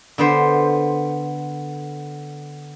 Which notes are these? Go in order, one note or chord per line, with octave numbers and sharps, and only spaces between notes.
D3 B3 C5